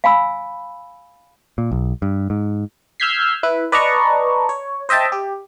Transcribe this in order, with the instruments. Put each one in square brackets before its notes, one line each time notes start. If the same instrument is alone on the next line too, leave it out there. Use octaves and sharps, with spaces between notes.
[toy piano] F5 G#5 B5 E6
[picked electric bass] A#2
B1
G2
G#2
[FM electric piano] E6 F6 G6 G#6 B6 C7
E4 B4
B4 D5 D#5 A5 A#5 C#6
C#5
C5 D#5 E5 G5 A5
G4